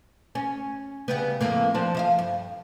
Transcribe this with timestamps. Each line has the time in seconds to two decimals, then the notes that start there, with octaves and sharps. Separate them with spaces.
0.35 C#4
1.08 C#3 G3 B3
1.40 F2 A2 A#3
1.74 F3 C4 D4
1.95 F3 D#5 F5
2.19 G2